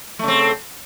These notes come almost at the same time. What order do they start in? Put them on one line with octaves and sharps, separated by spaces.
A3 C#3 C4